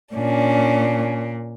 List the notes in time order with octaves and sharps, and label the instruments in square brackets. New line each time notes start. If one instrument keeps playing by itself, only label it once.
[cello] A#2 [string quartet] C#4 D4